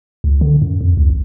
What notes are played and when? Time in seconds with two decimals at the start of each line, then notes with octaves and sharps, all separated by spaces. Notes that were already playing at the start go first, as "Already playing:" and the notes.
0.24 C#2
0.41 D3
0.62 F#2
0.81 F2
0.97 C#2
1.10 A#1